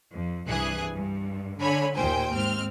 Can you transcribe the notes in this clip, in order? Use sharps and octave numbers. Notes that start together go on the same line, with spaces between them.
F2
C2 G2 E3 G#4 F#6
G2
D3 C#5 G#5 B5
D#2 A#2 C5 G5 G#5
G#2 C4 F6